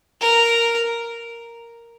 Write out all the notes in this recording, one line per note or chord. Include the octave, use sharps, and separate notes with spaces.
A#4